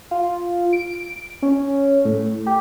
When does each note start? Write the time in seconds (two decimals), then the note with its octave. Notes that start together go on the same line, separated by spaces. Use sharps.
0.11 F4
0.73 D7
1.42 C#4
2.05 A2
2.46 G4